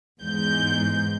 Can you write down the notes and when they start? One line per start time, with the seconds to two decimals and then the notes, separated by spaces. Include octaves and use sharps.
0.20 E2 G#2 G6